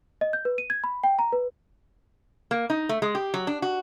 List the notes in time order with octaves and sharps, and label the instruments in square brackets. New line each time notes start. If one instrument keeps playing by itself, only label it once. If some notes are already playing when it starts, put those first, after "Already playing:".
[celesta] D#5
G6
B4
D#7
G#6
B5
G5
A#5
B4
[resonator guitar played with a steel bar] A#3
D#4
A3
G#3
G4
F#3
D4
F#4